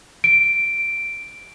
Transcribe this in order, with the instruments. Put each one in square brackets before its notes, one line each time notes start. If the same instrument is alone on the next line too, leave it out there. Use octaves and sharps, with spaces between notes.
[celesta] D7